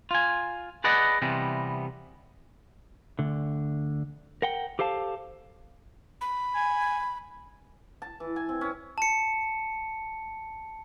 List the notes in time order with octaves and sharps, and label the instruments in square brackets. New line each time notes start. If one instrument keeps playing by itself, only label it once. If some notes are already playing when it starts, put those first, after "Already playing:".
[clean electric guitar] F4 G#5
G#4 B4 D5 D#5 F#5
C3 E3 G3 B3 C4
D2 D3
A#4 F#5 G5
G4 A4 C5 F5 A5
[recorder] B5
[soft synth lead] G#5
[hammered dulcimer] A5
E3
G#5
C4
C#4
[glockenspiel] A5 C#7